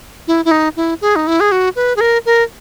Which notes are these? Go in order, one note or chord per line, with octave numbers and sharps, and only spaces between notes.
E4
E4
D#4
E4
G#4
D#4
E4
G#4
F#4
B4
G#4
A#4
A#4